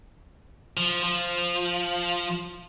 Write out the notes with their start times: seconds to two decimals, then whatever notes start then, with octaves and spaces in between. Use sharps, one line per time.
0.77 F3
1.03 F3